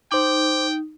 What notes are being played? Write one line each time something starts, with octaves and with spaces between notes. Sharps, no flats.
D#4 C5 G5 D6